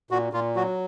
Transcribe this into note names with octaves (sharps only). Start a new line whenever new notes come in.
A#2 F#4
A#2 F4
F#3 F#4